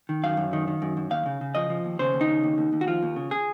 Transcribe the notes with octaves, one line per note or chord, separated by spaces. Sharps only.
D#3
F#2 F5
F#2
D#3
D#3
F#2
F#2
D#2 F5
C#3
C#3
F3 D#5
F3
D#2
C#3 C5
D#2
D#4
C#3
D#2
D#2
D#2
F#4
F3 F4
D#2
C#3
G#4